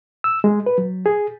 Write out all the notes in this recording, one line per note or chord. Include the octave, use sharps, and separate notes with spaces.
E6
G#3
B4
F#3
G#4